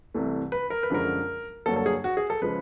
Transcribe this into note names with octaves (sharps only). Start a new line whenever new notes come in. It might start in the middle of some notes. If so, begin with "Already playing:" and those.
C2 C3 E3 A3
B4
A#4
B4
F#2 D3 F3 G#3 A#4
G2 D3 F#3 A#3 A4
A4
G#4
F#4
G#4
A4
C#3 F3 G#3 B4